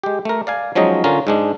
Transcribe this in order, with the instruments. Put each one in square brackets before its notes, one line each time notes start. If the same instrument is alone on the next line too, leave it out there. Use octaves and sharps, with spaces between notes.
[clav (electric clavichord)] G#3 G4
A3 A#4
D5 F5 G#5
F3 F#3 G#3 C#4 D#4 D#5
D3 C#4 F4 A#4
G#2 G#3 D4